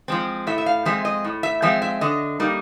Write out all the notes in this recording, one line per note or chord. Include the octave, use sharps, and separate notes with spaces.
F3 G#3 C4
A2 E5
E5
F5
F3 G#3 C4 E5
D#5
A2
E5
F3 G#3 C4 E5
E5
D3 D#5
G3 A#3 D#4